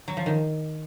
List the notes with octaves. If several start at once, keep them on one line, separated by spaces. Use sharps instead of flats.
F#3
F3
D#3